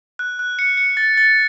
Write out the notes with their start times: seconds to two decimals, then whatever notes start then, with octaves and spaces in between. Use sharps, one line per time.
0.19 F#6
0.39 F#6
0.59 C#7
0.77 C#7
0.97 A6
1.17 A6